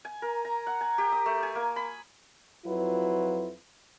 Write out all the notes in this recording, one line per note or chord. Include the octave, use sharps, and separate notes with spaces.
G#5
A#4
A#5
F#5
G#5
G4
D#6
A3
G#5
A#3
B5
F2 F#3 E4 F4 B4